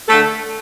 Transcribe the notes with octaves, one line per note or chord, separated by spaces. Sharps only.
D3 A3 A4